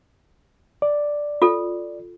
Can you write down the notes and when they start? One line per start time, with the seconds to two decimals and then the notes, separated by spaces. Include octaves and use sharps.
0.82 D5
1.42 F4 A4